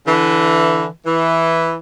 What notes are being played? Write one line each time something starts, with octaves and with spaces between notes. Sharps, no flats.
D3 E3
E3